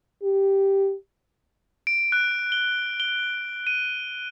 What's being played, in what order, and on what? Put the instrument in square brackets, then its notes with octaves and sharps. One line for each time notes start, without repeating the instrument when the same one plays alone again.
[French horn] G4
[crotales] D7
F#6
G7
G7
D#7